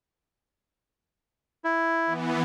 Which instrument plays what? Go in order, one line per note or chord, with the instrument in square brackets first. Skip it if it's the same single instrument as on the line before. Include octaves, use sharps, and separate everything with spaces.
[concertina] E4
[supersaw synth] E3 B3